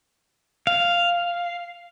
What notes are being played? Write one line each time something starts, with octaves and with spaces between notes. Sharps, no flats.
F5